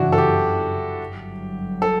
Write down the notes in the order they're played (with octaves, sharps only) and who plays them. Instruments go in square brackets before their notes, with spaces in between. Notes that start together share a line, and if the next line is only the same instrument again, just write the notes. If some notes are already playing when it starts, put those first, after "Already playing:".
Already playing: [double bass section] G1 F#2 C#3 E3 [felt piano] D4 E4 F#4
[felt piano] A4
G4
[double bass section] G1 G2 F#3
[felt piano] A4